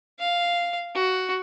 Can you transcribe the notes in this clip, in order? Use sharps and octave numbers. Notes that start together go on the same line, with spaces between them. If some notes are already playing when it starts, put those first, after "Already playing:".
F5
F#4